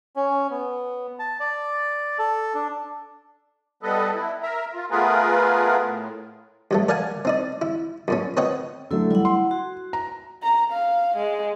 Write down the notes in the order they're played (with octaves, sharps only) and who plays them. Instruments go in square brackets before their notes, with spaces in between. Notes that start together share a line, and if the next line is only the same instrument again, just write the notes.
[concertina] C#4
B3
A5
D5
A4
D4
[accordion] G3 B3 A4 B4 D#5
E4
A#4 E5 A#5
F4
A3 B3 F4 G#4 A#4 B4
A2
[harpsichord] G2 F#3 A3
A#4 D5 F5 F#5 G#5
C4 D#4 D5
E4
F#2 A#2 C#4
C4 B4 C#5 D#5 F#5 G5
[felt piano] D3 F#3 A3 [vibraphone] E4 A4
[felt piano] G3 [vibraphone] E4 F#5
[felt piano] C6
[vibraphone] F#4
[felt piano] A#5
[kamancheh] A#5
F5
G#3